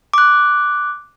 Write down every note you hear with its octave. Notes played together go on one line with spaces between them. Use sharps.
D6 F#6